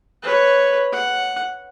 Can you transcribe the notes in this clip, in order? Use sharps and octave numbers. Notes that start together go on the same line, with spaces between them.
B4 C#5
F#5